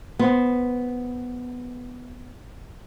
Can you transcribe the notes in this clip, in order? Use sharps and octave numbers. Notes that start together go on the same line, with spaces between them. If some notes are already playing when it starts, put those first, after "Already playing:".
B3 C5